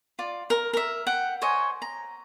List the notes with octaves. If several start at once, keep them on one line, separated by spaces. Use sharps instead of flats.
F4 D5
A#4
A#4 E5
F#5 G5
C5 C#5 D#5 G#5
A#5